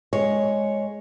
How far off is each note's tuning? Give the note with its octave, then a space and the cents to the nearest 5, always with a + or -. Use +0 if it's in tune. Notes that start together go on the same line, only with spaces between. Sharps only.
G#3 +0 C#5 +0